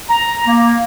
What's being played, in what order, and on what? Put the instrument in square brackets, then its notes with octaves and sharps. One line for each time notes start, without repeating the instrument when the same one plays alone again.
[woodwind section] A#5
A#3